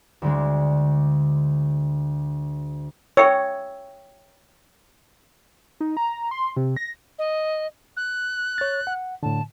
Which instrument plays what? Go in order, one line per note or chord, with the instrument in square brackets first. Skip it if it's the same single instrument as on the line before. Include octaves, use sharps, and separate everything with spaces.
[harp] D2 D3 G#3
[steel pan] C#5 [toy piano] E5 G5 E6
[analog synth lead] D#4
A#5
C6
C3
A#6
[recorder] D#5
F#6
[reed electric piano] C#5 A6
F#5
[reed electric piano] A2 D3 [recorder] A5